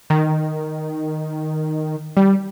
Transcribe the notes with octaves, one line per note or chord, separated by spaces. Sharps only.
D#3
G3